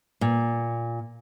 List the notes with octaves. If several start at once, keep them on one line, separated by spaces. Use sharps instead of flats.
A#2